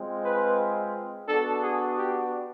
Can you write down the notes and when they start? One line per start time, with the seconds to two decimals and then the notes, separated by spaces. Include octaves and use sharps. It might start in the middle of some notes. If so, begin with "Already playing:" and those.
Already playing: G#3 C4 F4
0.25 B4
1.28 B3 D4 F#4 A4
1.62 G#4
1.96 G4